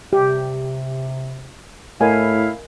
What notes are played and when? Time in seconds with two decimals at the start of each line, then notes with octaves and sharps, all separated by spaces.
0.13 C3 G4
2.01 A2 E4 A#4 D#5 F5 G#5